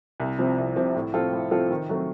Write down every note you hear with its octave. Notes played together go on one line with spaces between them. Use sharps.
C2
C3 F3 C4
C2
C3 F3 C4
A2
F3 C4 F4 A4
A2
F3 C4 F4 A4
D#3
F#3 A3 C4